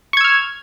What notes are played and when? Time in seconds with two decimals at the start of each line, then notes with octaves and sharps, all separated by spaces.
0.13 C#6
0.17 G#6
0.21 E6
0.24 F6